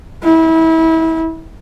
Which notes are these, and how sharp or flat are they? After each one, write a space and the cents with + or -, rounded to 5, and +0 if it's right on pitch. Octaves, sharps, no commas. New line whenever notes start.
E4 -30